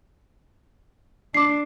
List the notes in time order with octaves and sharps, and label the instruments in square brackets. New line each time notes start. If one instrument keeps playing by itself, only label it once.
[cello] D4 [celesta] D6 C7